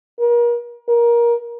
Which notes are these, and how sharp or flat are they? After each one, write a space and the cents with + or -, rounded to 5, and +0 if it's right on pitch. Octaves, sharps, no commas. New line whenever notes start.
A#4 +35
A#4 +20